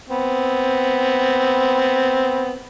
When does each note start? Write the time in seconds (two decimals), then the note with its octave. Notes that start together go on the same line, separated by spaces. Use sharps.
0.09 B3 C4